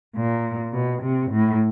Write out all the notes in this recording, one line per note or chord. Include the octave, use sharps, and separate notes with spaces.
A#2
B2
C3
A2